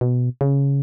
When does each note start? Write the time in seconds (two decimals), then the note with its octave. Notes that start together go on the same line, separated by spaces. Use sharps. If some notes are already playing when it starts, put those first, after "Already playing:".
0.01 B2
0.41 C#3